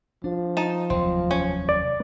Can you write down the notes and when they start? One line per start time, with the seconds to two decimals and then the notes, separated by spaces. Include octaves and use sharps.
0.24 F3 D4
0.57 D#4 A5
0.90 F1 D#2 F#3 C4
1.31 C#4
1.69 D5